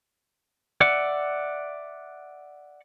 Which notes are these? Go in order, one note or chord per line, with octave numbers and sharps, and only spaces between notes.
D5 E5 F#5